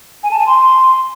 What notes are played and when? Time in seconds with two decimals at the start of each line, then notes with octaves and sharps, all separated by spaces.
0.23 G#5
0.31 A5
0.39 G#5
0.47 C6